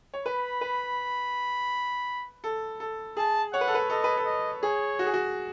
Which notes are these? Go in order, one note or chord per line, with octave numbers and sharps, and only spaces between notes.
C#5
B4 B5
B4
A4
A4
G#4 A5
C#5 F#5
B4
A4
B4
A4 D#5
B4
A4
D#5
G#4 C#5
F#4
G#4
F#4